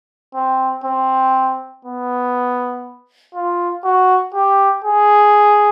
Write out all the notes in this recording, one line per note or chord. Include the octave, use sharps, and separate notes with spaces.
C4
C4
B3
F4
F#4
G4
G#4